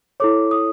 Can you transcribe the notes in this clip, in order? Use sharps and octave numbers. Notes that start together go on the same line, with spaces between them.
E4 A4 C#5 D6
D#6